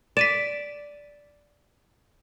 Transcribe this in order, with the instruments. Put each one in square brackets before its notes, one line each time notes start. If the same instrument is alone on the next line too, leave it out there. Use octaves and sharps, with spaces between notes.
[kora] D5 [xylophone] B6 D#7 E7